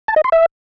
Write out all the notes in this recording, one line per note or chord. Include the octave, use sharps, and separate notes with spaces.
A5
D#5
C6
E5